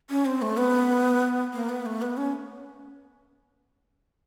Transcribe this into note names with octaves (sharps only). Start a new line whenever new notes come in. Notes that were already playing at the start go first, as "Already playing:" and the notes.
C#4
C4
A3
B3
A#3
B3
A3
B3
C#4